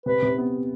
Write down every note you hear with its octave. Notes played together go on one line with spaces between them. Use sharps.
C3 B4
C3
B3